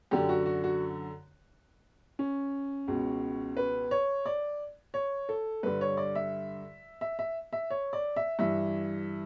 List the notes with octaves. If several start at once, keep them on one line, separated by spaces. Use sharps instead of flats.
F#2 D3 G4
F#4
F#4
F#4
C#4
C#2 B2
B4
C#5
D5
C#5
A4
G2 D3 B4
C#5
D5
E5
E5
E5
E5
C#5
D5
E5
G2 E3 E5